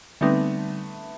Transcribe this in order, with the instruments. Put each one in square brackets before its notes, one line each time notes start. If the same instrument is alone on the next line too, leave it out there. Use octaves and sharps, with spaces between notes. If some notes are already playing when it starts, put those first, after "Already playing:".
[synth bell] D3 G3 C4 D#4 [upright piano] A3 B3